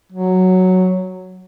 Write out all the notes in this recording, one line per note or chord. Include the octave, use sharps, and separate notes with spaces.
F#3